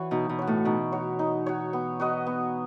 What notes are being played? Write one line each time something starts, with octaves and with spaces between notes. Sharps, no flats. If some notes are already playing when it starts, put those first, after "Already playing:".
Already playing: E3 F#4 C#5
B2 D#4
B2
F#4 C#5
A2
B2 D#4
F#4 C#5
D#4
F#4 C#5
B3
F#4 B4 D#5
B3